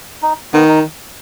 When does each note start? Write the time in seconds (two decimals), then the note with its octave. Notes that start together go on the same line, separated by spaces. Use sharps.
0.22 D#4
0.53 D#3 B3
0.68 D#4